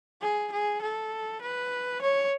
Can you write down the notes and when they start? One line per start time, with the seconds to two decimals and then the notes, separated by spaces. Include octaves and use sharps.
0.22 G#4
0.53 G#4
0.82 A4
1.41 B4
2.02 C#5